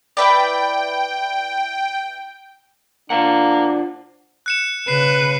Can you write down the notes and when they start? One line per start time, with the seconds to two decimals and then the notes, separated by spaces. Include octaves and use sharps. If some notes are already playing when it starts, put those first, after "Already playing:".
0.17 E4 B4 D5 G5
3.10 A#3 D4 F4 C5 F#5
4.46 F#6 C#7 E7
4.88 C#3 B4 C7